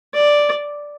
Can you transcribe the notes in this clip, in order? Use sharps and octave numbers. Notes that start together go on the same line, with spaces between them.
D5